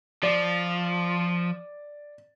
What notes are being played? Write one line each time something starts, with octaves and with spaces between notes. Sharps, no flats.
F3 D5